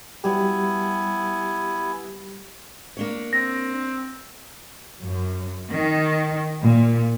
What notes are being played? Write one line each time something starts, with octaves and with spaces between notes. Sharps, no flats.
F#3 G3 B3 E4 G4 G#5
A#3 D4 C#5
C4 A#6
F#2
D#3
A#2